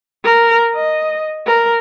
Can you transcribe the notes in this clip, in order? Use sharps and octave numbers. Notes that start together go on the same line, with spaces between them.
A#4
D#5
A#4